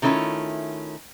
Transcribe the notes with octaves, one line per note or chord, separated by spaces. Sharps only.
C3 D#3 A3 C#4 E4 F4